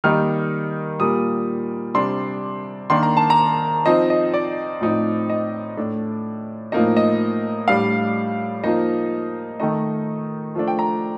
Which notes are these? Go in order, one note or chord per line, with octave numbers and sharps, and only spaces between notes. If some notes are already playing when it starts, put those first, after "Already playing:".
D#3 G3 A#3 D#4 F6
A#2 G3 A#3 D#6
C3 G3 D4 C6
D#3 A#3 D4 C6
A#5
A5
A#5
F3 C4 D#4 D#5
D#5
D5
A2 F3 C4 D#4
D#5
A2 A3 D4
A2 F3 A#3 D#4 D#5
D#5
A2 G3 D4 F5
F3 A#3 D#4 D#5
D#3 A3 D#4 D#5
F3 A3 D4
G5
A#5